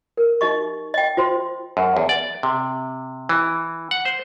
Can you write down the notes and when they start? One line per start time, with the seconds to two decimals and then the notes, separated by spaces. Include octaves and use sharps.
0.17 A#4
0.41 D#4 G4 D#5 C#6
0.94 D#5 G5
1.17 F4 C5 C6
1.77 F#2
1.97 E2
2.09 D5
2.43 C3
3.29 E3
3.91 F#5
4.05 C5